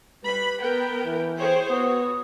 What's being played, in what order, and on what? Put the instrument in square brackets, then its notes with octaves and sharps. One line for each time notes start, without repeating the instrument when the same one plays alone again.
[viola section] G3 B5 [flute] B4
[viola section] B3 A#4 G5 [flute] B4
[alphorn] E3
[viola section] G#4 C5 C#5 [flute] G5
[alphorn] B3 [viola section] F#4 C#5 [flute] D#6